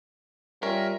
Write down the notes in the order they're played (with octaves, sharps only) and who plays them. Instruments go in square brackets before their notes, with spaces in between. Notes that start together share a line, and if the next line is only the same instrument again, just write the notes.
[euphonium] G3 [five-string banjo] C#4 [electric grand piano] F4 A#4 [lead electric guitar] E5